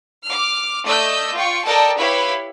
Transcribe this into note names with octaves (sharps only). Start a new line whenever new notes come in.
D6 F6
A3 D5 D#5 E6 G6
F4 G5 C#6
A4 A#4 D5 D#5 G5 A5
E4 G4 B4 C#5 F5 B5